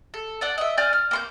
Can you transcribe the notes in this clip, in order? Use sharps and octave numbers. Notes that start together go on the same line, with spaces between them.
A4
A4 D5 F#5
D#5 E5
D5 G#5 F6 G6
F6
A#3 C6 G6